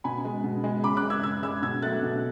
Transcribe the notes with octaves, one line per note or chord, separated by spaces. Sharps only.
B2 G#5 B5
G#3
B2
G#3
C#3 B5 D6
D6 F#6
G#3
E6 G#6
C#3 E6 G#6
G#3 E6 G#6
B2 E6 G#6
F#3 A3 F#6 A6
B2